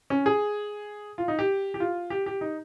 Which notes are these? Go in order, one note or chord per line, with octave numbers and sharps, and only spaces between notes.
C#4
G#4
F4
D#4
G4
G4
F4
G4
G4
D#4